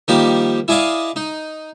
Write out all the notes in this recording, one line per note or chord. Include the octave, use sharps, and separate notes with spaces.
D#3 F3 G3 A#3 G4
E4 G#4 D5 D#5 F5
D#4